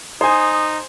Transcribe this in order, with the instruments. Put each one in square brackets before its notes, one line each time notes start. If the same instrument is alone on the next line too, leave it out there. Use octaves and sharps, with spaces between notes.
[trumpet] D#4 [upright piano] C5 G#5 [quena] D#6